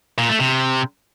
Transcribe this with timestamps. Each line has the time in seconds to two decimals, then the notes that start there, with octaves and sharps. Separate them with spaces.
0.18 A#2
0.29 A3
0.40 C3